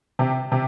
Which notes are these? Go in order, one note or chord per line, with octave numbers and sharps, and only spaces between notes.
C3
C3